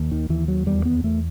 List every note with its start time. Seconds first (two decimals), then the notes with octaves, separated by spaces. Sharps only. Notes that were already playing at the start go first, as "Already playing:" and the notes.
Already playing: D#2
0.11 D#3
0.29 D#2 E3
0.48 F#3
0.66 E2 G3
0.85 B3
1.03 E2 A3